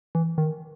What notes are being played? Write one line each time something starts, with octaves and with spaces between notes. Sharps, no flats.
E3
D#3